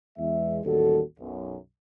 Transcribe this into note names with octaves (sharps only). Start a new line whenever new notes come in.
E2 G#3 E5
A1 D#2 G3 F#4 A4
B1 F#2